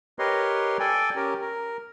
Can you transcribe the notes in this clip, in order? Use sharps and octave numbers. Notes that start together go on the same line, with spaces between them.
G4 A#4 B4 C#5 D#5 C6
A4 D5 G5 G#5
C#4 G4 A#4
A#4